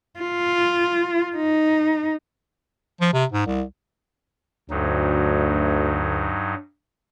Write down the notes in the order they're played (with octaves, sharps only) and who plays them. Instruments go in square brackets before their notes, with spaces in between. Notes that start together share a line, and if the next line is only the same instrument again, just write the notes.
[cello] F4
D#4
[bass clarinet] F3
C3
G#2
C2
[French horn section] D2 [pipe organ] G2 F#3 D#4